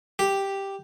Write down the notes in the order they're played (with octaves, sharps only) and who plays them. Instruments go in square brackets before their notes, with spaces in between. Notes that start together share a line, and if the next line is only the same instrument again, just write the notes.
[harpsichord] G4